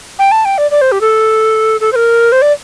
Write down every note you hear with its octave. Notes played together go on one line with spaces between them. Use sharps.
G5
A5
G5
D5
D5
C5
G4
A4
A4
C5
A#4
C5
D5